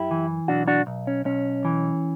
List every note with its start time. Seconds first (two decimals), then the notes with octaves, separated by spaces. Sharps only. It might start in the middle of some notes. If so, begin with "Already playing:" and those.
Already playing: F#2 E4 G4
0.11 E3
0.48 B1 D4 F#4
0.68 D4 F#4
0.87 B1
1.07 C#4
1.25 B1 C#4
1.65 E3